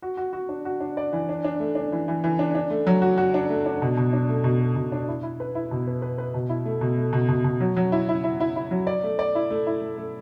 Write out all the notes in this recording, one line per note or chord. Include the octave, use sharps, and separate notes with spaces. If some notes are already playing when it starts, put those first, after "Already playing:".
F#4
F#4
F#4
D4
F#4
D4
D5
E3
D4
D4
A3
D4
E3
E3
E3
D4
D4
A3
F#3
F#4
F#4
D4
A3
D4
B2
B2
D4
A3
B2
A3
B2
D4
E4
E4
B4
E4
B2
B4
B4
B4
B2
E4
A3
B2
A3
B2
B2
B2
F#3
F#3
E4
E4
E4
E4
E4
F#3
D5
A3
D5
E4
A3
E4
A3
A3